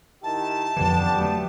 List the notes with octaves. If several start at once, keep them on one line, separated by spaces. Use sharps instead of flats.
D#3 E4 G4 A5
F2 D3 E3 B3 D4 G4
F#3 A3